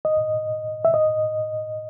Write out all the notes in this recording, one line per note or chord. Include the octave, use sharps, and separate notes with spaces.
D#5
E5
D#5